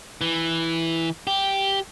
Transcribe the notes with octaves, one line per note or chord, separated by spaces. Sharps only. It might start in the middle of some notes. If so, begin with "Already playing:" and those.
E3
G4